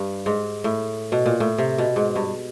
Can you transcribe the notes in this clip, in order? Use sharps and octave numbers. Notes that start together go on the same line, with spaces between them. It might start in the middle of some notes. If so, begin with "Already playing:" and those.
Already playing: G2
G#2
A2
B2
A#2
A2
C3
B2
G#2
G2